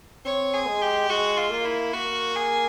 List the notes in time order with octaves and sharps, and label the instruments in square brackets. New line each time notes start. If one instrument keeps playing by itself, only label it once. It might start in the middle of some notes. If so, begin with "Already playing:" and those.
[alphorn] C4 [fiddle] C#5
[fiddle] G#4
[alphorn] G#3
[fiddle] G4
[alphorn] G#3 [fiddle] F#4
[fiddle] F4
[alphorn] A#3
[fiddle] E4
[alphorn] A#3 [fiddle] F#4
[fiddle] G#4